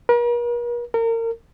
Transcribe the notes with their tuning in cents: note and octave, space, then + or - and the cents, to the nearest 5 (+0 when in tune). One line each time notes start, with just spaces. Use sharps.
A#4 +45
A#4 -30